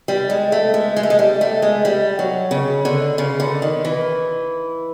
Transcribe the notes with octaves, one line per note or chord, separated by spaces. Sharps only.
G3
G#3
A3
G#3
G#3
A3
G#3
G3
A3
G#3
G3
F#3
C#3
D3
C#3
D3
D#3
E3